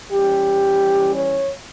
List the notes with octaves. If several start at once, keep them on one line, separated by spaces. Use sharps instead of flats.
E3 G3 C#4 G4
C#5